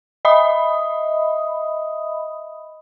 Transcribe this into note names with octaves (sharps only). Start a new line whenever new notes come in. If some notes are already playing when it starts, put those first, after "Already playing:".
D#5 E5 B5 D#6